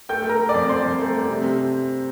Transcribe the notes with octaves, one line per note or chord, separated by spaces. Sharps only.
A3 G5 G6
A3
A#4 A#5
A3
D5 D6
F2
F2 C5 C6
F2
A3
A3
C3
C3